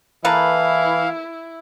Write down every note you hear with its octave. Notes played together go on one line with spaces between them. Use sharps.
E3 A#3 E4 A4 B4 F5